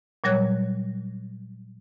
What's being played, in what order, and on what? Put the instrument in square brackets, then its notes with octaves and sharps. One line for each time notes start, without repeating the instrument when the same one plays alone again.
[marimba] A#2 F#3 G3 C#5 F#6 G#6